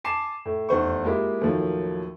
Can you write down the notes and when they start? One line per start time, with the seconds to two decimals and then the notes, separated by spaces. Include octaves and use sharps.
0.04 G#5 A5 D6 C7 E7
0.45 A2
0.69 F1 E2 C5 C#6
1.05 G#3 A#3 E4 F4 G4
1.41 D#2 A2 D#3 F3 F#3